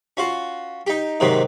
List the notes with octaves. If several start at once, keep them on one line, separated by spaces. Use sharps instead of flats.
C#4 F4 F#4
D#4 G4
G#2 C3 D#3 F#3